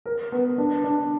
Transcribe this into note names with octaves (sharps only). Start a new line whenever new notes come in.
A#4
B3
D4
D4